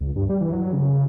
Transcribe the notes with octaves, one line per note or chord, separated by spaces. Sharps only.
C#2
G2
G3
E3
F#3
C#3
C#3